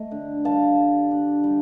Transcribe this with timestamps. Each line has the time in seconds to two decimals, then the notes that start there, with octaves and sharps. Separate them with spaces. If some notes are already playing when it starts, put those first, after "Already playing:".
Already playing: A3 D#5
0.11 D3
0.44 G3 F5 A5
0.78 G3
1.11 D4
1.44 G3